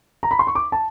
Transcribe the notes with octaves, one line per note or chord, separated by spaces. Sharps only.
A#5
B5
C6
C#6
D6
A5